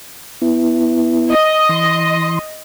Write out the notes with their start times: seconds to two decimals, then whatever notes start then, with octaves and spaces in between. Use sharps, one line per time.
0.42 B3 E4
1.31 D#5
1.69 E3 C6